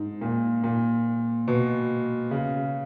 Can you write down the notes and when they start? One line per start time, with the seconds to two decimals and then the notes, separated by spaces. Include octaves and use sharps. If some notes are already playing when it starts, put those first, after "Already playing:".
Already playing: G#2
0.21 A#2
0.64 A#2
1.48 B2
2.31 C#3